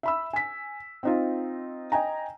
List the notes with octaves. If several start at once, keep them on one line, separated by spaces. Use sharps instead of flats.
E5 B5 E6
G#5 B6
C4 D#4 F4
D#5 G5 G#5 A#5